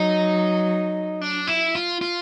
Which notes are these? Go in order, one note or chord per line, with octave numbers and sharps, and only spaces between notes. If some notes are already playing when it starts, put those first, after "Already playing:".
Already playing: F#3 D#4
D4
E4
F4
F4